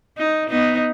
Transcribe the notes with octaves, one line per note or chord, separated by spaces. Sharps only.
D#4
B3 D#4